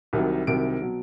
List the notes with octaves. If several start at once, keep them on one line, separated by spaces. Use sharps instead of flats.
C2 C3 D#3 F#3
C2 C3 D#3 F#3 D7
B2 F#3